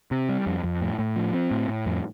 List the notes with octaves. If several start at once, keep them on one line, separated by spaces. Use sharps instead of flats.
C3
G3
F2
F2
A2
A2
F3
C4
A2
A2
F2